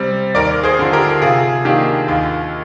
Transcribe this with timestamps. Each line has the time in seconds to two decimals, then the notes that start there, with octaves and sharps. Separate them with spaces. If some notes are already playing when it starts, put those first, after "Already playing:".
Already playing: C3 G3 C4
0.35 D#2 A#4 D5
0.63 G#4 C5
0.79 D3 F3
0.93 G4 A#4
1.22 C3 F4 G#4
1.65 D#3 A#3 D4 G4
2.08 D#2 F4